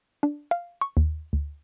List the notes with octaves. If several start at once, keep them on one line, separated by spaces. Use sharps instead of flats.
D4
F5
C#6
D#2
D2